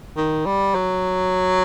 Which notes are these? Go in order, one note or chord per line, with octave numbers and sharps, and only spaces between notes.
D#3
G3
F#3